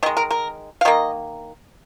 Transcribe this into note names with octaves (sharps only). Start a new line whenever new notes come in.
D#3 G#3 D#5
A#4
A#4
F5
D#3 A#3 D#5